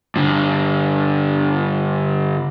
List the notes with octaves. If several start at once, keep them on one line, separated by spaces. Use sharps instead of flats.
G2 D3